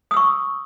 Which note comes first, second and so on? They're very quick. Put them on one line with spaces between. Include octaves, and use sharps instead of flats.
D#6 E6 C#6